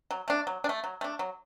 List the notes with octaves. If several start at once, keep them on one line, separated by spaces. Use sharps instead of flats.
F#3
A3 D4
F#3
D4
A3
F#3
A3 D4
F#3